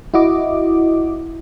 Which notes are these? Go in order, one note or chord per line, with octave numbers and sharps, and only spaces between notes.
E4 F#4 D#5 D6